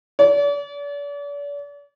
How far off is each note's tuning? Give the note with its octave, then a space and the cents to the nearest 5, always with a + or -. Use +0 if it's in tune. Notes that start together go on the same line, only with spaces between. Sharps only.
D5 -40